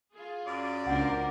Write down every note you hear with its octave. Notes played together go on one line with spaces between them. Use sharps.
F4 G#4
F#2 D5
C#2 A#3 D4 A#4 C5 F#5